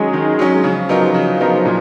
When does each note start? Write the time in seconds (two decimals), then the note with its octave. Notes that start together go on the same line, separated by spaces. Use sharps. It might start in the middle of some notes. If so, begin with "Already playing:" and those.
Already playing: D#3 F#3 G#3 C#4
0.13 D#3
0.39 F#3 C#4
0.64 C#3 F3
0.89 F#3 B3 D#4 A#4
1.14 C#3 F3
1.40 F#3 B3 D#4 A#4
1.65 A#2